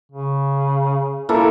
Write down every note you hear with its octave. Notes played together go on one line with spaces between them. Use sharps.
C#3
A#3 E4 A4